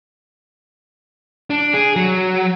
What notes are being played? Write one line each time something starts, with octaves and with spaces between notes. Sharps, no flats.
D4
G#4
F#3